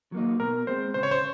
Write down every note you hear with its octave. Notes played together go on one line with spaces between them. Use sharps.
F#3 A#3 D#4
B2 A#4
G#3 C4 C5
C#3 C5
C#5
C5